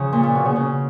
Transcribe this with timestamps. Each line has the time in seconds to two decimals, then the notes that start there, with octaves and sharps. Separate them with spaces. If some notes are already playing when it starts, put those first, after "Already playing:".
Already playing: C#3 F3
0.13 A#2
0.23 A#2
0.35 B2
0.45 C#3
0.56 C#3